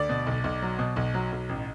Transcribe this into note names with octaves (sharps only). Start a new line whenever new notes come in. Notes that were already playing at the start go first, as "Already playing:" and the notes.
Already playing: D2 D5
B2
B1
B1
F#3
B2
B1
F#3
B1
A1